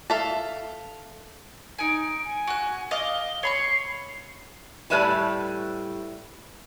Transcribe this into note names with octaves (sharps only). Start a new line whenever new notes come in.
A4 E5 F5
D#4 G#5 D7
G#5
F#4 F#6
D#5 F5 D6 G7
C#5 B5 C#6 C7
A2 G3 B4 E5 G#5 A5